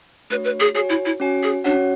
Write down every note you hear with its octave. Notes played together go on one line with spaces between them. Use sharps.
A3 D4 F#4 B4 C#5
B4
G#4
F#4 G#4 C#5 G#5
E4
E4
C#4 F#4 C#5 G#5
G#4
C#4 D4 F#4 C#5 F#5